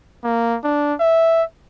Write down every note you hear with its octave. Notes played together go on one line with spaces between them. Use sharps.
A#3
D4
E5